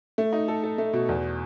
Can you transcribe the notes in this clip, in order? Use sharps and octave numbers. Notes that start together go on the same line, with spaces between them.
A3
D#4
A4
A4
A3
B2
E2